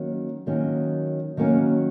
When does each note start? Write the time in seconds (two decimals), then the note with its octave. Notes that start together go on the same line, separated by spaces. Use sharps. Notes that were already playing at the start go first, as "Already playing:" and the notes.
Already playing: D#3 F#3 A#3 C#4
0.47 D#3 F#3 A#3 C#4
1.37 D#3 F#3 A#3 C#4